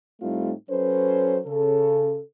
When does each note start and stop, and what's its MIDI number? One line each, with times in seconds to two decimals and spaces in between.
0.21 0.52 45
0.21 0.52 55
0.21 0.52 57
0.21 0.52 60
0.21 0.52 63
0.21 0.52 65
0.69 1.39 54
0.69 1.39 61
0.69 1.39 69
0.69 1.39 71
0.69 1.39 72
1.46 2.20 49
1.46 2.20 69